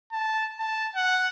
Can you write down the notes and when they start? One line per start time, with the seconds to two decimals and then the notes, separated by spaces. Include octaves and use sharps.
0.12 A5
0.60 A5
0.95 F#5